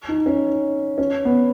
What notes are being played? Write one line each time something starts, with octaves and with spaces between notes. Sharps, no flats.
D#4
C#4
C#4
B3